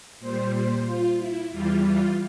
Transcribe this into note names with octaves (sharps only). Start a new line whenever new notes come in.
A#2 G3 C5
C5
F4
E4
E2 E3 G3 F4
F4